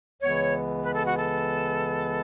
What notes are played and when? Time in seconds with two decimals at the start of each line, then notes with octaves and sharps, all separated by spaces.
0.21 C#2 C#3 E3 B3 C#5
0.83 B4
0.95 A4
1.07 F#4
1.18 A4